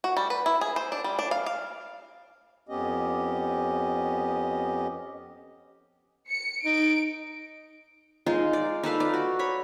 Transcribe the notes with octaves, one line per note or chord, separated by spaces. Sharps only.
F#4
G3
B4
E4
G#4
C5
D4
G3
D4
F5
F5
F2 B3 C#4 G4 D#5
C#7
D#4 D7
G#3 D#4 F4
D5
D#4 A4 B4 F5
D5
F#4
C#5 B5